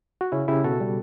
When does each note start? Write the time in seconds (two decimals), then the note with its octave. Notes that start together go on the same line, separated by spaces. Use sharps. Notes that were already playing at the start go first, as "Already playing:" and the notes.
0.21 F#4
0.32 C#3 C#4 E4
0.48 C#3 E4 G4
0.64 B2 F#4 A4
0.81 G3